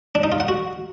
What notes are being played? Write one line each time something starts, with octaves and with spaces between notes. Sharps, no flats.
D4
D#4
F4
F#5
F#4